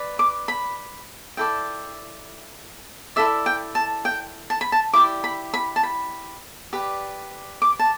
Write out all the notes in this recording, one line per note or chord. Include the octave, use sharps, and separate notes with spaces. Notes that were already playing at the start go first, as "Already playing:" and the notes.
Already playing: B4 D5
D6
B5
E4 A4 D5 G5
E4 A4 D5 E5
G5
A5
G5
A5
B5
A5
E4 G4 D5 D6
B5
B5
A5
B5
G4 B4 D5
D6
A5